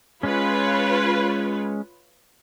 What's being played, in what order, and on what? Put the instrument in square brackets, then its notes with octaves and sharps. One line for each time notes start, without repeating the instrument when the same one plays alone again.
[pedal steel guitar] G#3 C#4 [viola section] F4 B4 C#5